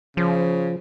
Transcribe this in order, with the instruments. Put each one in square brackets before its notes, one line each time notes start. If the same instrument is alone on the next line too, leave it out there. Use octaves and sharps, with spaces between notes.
[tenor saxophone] C#3 [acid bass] F3